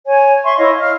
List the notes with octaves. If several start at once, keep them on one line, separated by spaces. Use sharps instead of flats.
C#5 G#5
E5 C6 C#6
E4 C#5 D#5 F5
F5 F6